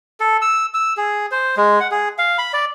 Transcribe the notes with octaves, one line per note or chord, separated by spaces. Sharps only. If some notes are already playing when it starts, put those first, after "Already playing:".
A4
E6
E6
G#4
C5
G#3
F#5
G#4
F5
B5
D5